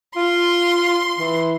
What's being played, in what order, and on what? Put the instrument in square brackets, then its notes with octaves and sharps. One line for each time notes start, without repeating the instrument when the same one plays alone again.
[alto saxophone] F4 [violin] C6
[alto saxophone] E3